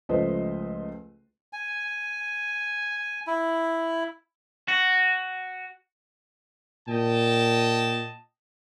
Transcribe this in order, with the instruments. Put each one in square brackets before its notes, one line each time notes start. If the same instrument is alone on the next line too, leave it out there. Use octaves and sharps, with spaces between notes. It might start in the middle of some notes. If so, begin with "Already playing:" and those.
[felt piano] C#2 F3 A3 B4 C5 D#5
[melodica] G#5
E4
[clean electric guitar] F#4
[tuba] A#2 [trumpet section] D#5 G5 A5